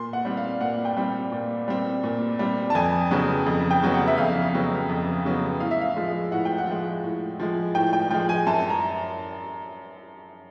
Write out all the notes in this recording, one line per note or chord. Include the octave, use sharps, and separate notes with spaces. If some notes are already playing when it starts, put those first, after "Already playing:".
Already playing: A#2 C6
F#5
G3 C4
F5
A#2 F#5
G5
G3 C4
A#2
G3 C4
A#2
G3 C4
A5
F2 G#5
C#3 F#3 B3
F2
G5
C#3 F#3 B3
F#5
E5
F2 F5
C#3 F#3 B3
F2
C#3 F#3 B3
A2 F5
E5
F5
F3 G#3
A2 F#5
G5
F#5
F3 G#3
A2
F3 G#3
A2 G5
G5
F3 G#3 G5
G#5
F#2 A5
A#5